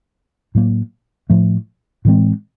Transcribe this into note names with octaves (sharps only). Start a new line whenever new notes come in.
A2 F#3 A#3
A2 F3 A3
A2 E3 G#3 C4